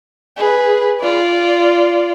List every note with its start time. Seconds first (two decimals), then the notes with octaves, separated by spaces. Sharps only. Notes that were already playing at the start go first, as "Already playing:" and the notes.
0.37 G#4 B4
1.00 F4 D5